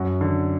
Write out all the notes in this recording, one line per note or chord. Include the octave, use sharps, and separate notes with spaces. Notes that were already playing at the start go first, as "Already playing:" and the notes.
Already playing: F#2 F#4
D3